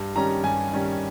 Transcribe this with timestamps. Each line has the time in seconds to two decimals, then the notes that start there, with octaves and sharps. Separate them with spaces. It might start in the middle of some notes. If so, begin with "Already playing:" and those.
Already playing: G2
0.15 D#3 G3 C#4 A#5
0.44 G2 G#5
0.73 D#3 G3 C#4